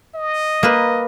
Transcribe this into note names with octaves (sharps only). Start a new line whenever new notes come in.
D#5
A#3 B4